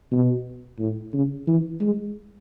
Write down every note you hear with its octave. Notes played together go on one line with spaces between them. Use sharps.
B2
A2
C#3
E3
G#3